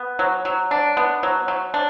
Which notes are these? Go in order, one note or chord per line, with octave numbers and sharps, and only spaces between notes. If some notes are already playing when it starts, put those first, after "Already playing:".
Already playing: B3
F#3
F#3
D4
B3
F#3
F#3
D4